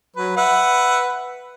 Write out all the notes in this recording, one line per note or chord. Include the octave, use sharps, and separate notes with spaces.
F#3 B4
B4 E5 F#5